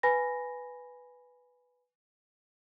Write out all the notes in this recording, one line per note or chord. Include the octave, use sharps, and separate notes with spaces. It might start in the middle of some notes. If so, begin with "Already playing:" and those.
B4 G#5 B5 A#6